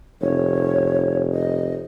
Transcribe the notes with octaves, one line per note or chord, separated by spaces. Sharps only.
F1 C#5
D#5